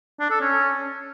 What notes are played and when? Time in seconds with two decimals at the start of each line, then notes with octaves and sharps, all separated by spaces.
0.20 D4
0.30 A4
0.40 C#4